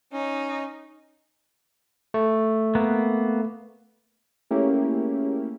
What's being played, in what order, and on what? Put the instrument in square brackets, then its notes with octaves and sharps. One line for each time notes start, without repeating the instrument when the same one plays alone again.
[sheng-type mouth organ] C#4 [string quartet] D#4
[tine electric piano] A3
[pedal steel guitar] A#3 B3
[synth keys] A3 A#3 C#4 E4 G4 G#4